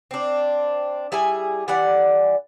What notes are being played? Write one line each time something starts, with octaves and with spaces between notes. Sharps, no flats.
C4 D4
G3 E4 G#4 G#5
E3 G3 D5 F#5